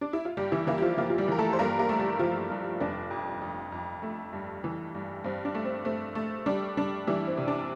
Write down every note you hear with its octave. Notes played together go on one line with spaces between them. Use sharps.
D4
E4
F4
G2 G3 G4
E3 E4
E3 A#3 E4
G4
F3 F4
F3 A#3 F4
F4
G3 G4
E3 A#4
A3 A4
C5
G2 A#3 A#4
A#3 A#4
A3
G3 G4
F3 F4
G2
F1 D4
F2
F2
F2
A3
G2
E3
G2
G2 C4
D4
A3
C4
A3 C4
A3
G3 D4
G3 D4
E3 G3 E4
C4
C3
D4